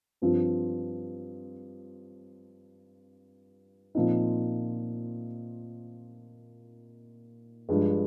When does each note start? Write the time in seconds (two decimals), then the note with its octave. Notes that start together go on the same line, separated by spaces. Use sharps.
0.22 G2 F3 C4 F4
3.95 A#2 F3 C4 D#4
7.69 G2 F3 G#3